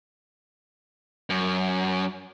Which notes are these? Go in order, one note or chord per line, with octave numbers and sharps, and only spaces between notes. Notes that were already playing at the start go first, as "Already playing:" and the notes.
F#2